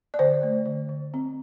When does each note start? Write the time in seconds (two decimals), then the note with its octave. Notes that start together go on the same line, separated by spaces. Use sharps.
0.14 D5
0.19 D3 C5
0.43 A3
0.66 D3
0.89 D3
1.14 C4